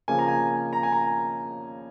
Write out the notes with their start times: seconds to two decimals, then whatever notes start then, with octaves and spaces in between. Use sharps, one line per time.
0.08 C#3 F3 A#3 G#5
0.19 A#5
0.28 G#5
0.73 A#5
0.83 G#5
0.93 A#5